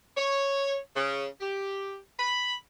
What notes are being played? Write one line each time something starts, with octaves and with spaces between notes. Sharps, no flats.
C#5
C#3
G4
B5